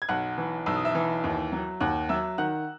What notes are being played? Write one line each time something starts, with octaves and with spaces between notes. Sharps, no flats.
G#6
B1 F#5 F#6
E3
B1 E6
D#6
E5 E6
E3
D#2
F#3
D#2 F#5 F#6
F#3 E5 E6
D#3 F#5 F#6